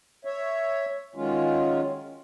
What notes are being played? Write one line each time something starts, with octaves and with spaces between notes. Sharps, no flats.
C#5 E5
D#3 F#3 G#3 C#4 F4